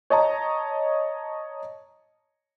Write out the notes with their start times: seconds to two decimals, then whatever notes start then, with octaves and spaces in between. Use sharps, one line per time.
0.10 C#5 D#5 A5 A#5